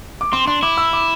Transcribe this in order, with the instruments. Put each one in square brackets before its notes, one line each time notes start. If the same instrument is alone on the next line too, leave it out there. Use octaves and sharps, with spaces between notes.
[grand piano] D6
[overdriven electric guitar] C4 [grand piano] C6
[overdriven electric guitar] D4 [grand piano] C6
[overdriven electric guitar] E4 [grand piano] D6
[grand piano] E6
D6